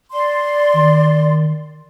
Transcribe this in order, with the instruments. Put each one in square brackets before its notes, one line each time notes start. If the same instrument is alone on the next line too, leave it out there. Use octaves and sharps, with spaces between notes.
[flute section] D5 C6
[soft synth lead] D#3